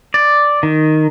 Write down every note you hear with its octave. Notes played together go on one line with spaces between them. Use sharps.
D5
D#3